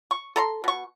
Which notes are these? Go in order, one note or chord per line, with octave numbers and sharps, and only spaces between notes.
C#6
A4 A#5 C6
B2 C#6